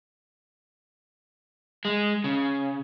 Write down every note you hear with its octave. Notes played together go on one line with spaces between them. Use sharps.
G#3
C#3